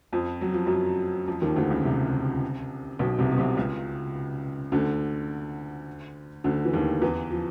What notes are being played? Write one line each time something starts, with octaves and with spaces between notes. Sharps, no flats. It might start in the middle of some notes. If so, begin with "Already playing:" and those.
F2 F3
F#3
F3
F#2 F#3
F2 F3
D#2 D#3
D2 D3
C#2 C#3
C2 C3
B1 B2
C2 C3
B2
C2 C3
C#2 C#3
D2 D3
D2 D3
E3
D#2 D#3
E2 E3
F3